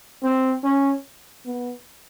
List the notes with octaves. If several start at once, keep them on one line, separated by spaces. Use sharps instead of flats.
C4
C#4
B3